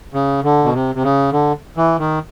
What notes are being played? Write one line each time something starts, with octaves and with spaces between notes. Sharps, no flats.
C#3
D3
B2
C3
C3
C#3
D3
E3
D#3